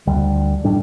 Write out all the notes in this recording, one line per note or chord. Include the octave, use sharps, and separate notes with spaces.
D2 D3 G3
A2 G3 D4